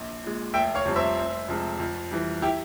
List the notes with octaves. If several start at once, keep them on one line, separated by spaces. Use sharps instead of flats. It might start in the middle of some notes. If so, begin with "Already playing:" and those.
Already playing: A#1
A#2 G#3
F1 E5 G5
C#5 F5
F2 C3 G3
C5 E5
F1
F2 C3 F3 G#3
F2
E3 G3
E4 G4